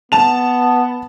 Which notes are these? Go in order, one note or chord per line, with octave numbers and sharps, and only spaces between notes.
B3 A5 F7